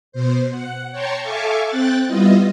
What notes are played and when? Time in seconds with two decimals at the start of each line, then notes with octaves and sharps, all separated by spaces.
0.12 B2 C5
0.51 F#5
0.91 C#5 G5 A5 A#5 C6 C#6
1.22 A4 E5 F5 G#5 C#6 D6
1.68 C4 G5 F#6 A6
2.07 G3 B3 E4 F4 D#5